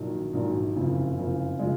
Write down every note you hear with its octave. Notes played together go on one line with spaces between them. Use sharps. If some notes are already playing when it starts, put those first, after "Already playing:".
Already playing: A#1 D#3 F#3
A#1 G#2 D#3 F#3
F#1 F2 C#3
F#1 F2 C#3
C#3 F3 G#3